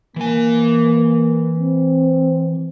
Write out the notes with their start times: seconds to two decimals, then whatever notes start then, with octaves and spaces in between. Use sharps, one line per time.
0.16 E3 A#3 G#5
1.60 C4